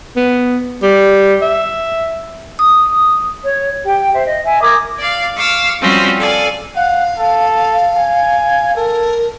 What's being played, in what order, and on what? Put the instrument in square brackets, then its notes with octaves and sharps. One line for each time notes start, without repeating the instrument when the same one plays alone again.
[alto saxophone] B3
G3
E5
[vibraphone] D#6
[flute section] C#5
G4 G5
C5 E5
D#5
E5 G#5
A#4 D6 D#6 G#6
[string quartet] D5 F5
F5 C#6 D6 E6 F6
F3 G3 C4 C#4 F4 F#4
A4 D5 F5 G#5
[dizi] F5 [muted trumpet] F#5
[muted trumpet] A4
G#5
[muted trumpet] A4 [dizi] A#4